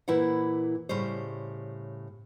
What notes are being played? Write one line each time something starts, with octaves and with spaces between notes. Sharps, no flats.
A#2 E3 E4 C5 F#5
A2 C#3 G3 C5